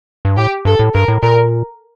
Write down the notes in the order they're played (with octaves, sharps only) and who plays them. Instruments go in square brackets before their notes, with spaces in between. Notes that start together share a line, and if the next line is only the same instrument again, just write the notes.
[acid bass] G2
[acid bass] A2 [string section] G4
[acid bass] G2 [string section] A4
[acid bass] A2
[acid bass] G2 [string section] A#4
[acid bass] A2
[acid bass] A#2 [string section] A#4